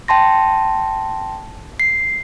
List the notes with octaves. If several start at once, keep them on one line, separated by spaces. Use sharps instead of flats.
G5 A5 C6 A#6
C7